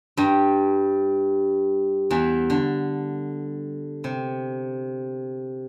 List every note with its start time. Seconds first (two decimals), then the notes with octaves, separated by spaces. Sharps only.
0.17 G2 G3
2.11 E2 E3
2.50 D3
4.04 C3